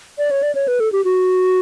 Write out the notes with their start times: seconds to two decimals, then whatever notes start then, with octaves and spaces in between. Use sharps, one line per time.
0.18 D5
0.31 C#5
0.43 D5
0.55 C#5
0.68 B4
0.80 A4
0.92 G4
1.05 F#4